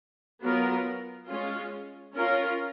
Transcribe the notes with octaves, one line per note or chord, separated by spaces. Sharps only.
F#3 B3 F4 A#4
G#3 C#4 F4
C#4 F4 A#4